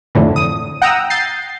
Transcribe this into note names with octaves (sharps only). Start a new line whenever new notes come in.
F2 A2 D3 E3
D#6
F#5 G5 A#5 D#6 E6
G6 A6 C7